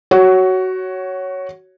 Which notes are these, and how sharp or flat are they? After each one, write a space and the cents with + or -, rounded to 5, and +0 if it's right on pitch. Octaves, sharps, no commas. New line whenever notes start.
F#4 +15 C#5 +0